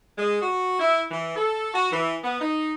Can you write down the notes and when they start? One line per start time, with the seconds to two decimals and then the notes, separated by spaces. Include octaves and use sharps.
0.18 G#3
0.41 F#4
0.79 E4
1.10 E3
1.35 A4
1.74 F#4
1.92 E3
2.23 B3
2.40 D#4